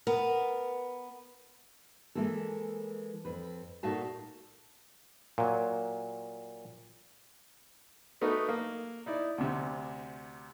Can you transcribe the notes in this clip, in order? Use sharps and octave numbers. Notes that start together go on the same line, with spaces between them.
B3 A#4
E3 G#3 A#3 A4
F2 B4
A#2 A3 D#4 F#4 F5 A5
A#2 F#3
A3 B3 D#4 F#4 A#4
A#3
D#4 E4 D5
D2 C3